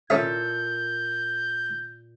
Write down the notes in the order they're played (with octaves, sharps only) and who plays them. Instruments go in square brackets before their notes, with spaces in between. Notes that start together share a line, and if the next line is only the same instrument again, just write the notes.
[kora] A#2 A4 [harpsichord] C#4 C#5 E5 [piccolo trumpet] G6